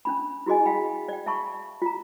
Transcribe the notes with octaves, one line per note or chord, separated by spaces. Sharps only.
C#4 D4 B5
E4 F#4 G#4 D#5 G#5
F5 G5 B5
D5 G5
E5 F5 A5 B5 C#6
F4 A#5